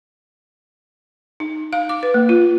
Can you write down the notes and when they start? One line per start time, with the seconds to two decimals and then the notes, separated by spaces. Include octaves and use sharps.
1.40 D#4
1.73 F5
1.89 D6
2.03 B4
2.14 A#3
2.29 F4